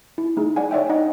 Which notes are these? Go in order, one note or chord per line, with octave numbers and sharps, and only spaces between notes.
E4
A3 D#4 G#4
D5 F#5 G#5
C#5 D5 E5 G5
D#4 D#5 F#5